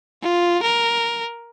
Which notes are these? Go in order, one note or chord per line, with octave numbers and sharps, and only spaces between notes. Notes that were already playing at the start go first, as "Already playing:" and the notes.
F4
A#4